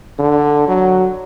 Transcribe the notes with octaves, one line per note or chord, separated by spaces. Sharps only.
D3
F#3